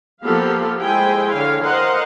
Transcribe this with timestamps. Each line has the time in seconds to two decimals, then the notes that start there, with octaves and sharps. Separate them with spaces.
0.23 F3 A#3 B3 G4 A4 F5
0.79 G#3 E4 C5 G5 G#5
1.33 D3 C#5 F5
1.63 A#4 C5 D#5 F5 F#5